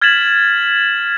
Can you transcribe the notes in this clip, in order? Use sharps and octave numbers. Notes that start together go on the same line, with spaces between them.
F6 G#6 A6 B6 E7 F#7